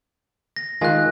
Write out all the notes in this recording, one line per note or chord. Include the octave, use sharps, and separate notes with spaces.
A#6
D#3 G#3 F4 G#5 F#6